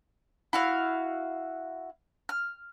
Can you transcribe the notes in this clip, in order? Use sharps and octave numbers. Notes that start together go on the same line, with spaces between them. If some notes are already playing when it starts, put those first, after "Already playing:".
E4 F#4 F5
F6